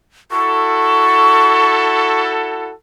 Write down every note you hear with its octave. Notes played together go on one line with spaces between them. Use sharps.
E4 F#4 A4 C#6